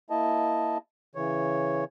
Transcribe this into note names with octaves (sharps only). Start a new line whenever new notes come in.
A#3 E4 D#5 A5
C#3 E3 C#5